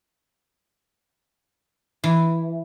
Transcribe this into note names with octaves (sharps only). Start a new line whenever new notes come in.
E3